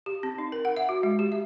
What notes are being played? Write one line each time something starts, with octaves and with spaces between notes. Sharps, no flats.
G4
C4
D#4
A#4
F#5
E5
F#4
G#3
G4
E5